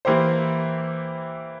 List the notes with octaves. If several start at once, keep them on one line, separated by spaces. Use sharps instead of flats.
E3 A#3 E4 G4 C5